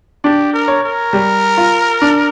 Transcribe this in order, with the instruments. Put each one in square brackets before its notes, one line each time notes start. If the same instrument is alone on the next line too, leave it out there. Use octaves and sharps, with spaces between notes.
[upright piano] D4 [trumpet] G4
[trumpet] A#4
[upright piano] C#5
[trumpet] A#4
[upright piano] G3
F4
D4